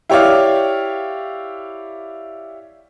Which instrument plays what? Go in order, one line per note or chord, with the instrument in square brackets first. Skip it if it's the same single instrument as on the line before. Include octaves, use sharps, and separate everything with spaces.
[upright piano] E4 G4 C#5 D5 F5